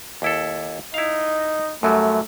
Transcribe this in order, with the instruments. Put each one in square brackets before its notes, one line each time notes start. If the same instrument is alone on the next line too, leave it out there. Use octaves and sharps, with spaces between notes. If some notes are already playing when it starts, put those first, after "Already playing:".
[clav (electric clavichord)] D#2 E4 A4
[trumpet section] D#4 D#5 [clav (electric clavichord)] E4 F5
[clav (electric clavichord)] F#2 F#3 G3 [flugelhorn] A3